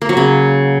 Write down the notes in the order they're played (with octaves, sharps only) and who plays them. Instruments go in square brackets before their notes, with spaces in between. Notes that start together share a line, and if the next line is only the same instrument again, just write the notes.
[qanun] A#3
F#3
C#3